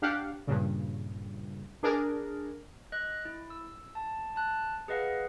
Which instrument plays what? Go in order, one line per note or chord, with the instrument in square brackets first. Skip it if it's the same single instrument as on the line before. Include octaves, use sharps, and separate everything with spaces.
[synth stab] D4 G4 F5 F#5
G2 A#2 C#3
D4 G#4 A#4 D5
[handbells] D#5 F#6
E4
E6
A5
A5 F#6
G#4 B4 D#5 F5 F#5